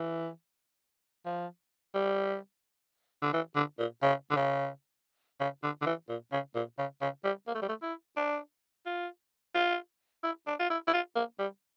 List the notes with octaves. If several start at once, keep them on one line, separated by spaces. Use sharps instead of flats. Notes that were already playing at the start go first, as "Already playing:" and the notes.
Already playing: E3
F3
G3
D3
E3
D3
A#2
C#3
D3
C#3
C#3
D3
D3
E3
A#2
C#3
A#2
C#3
C#3
G3
A#3
A3
G3
A3
E4
D4
F4
F4
E4
D4
F4
E4
E4
F4
A#3
G3